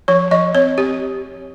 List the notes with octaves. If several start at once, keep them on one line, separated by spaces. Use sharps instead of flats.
F3 C#5
F3 D#5
C4 C#5
C4 G4